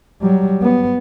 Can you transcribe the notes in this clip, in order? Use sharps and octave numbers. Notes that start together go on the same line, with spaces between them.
F#3 G3
B3